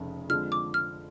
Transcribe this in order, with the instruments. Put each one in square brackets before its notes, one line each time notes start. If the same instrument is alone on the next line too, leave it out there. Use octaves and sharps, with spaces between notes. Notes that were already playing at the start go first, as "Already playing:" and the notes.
Already playing: [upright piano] F1 F2 C#3
[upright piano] F2 D3 F3 G#3 [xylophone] F6
[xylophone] D6
F6